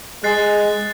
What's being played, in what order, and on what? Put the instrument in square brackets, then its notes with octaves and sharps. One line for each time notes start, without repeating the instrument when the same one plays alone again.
[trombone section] G#3 [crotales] F#6 A6 C7